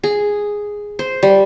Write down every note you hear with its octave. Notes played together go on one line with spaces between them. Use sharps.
G#4
C5
G3